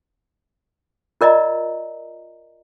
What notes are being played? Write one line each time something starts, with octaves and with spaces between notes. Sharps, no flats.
F4 A#4 D5 D#5 A#5